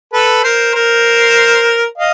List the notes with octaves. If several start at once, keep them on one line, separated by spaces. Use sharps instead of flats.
A4 B4
A#4 C5
A#4 C5
D#5 F5